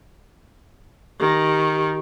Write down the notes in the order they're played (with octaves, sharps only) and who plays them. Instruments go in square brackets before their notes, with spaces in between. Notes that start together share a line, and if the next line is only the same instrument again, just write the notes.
[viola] D#3 [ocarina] G4